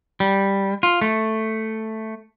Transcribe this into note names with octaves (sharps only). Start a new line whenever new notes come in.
G3
F4
A3